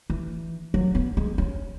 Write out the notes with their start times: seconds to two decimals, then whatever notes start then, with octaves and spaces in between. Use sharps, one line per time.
0.10 E3
0.74 F#3
0.95 B3
1.17 G#3
1.38 C#4